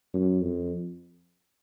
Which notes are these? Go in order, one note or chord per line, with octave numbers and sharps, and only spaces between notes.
F#2
F2